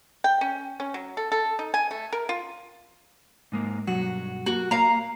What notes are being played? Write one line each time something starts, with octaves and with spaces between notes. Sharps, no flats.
G5
C#4
C#4
F#3
A4
A4
D#4
G#5
A3
A#4
F4
G#2 G#3 A#3
B1 G2 F#3 F#4
A#3 F#4
A#3 F5 A#5